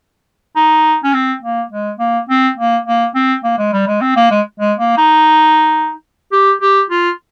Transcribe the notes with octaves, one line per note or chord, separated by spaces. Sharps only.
D#4
C#4
C4
A#3
G#3
A#3
C4
A#3
A#3
C4
A#3
G#3
G3
G#3
C4
A#3
G#3
G#3
A#3
D#4
G4
G4
F4